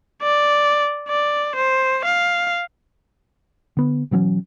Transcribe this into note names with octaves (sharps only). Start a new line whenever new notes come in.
D5
D5
C5
F5
D3 B3
B2 E3 F#3 C#4